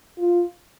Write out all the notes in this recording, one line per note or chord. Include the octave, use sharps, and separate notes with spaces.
F4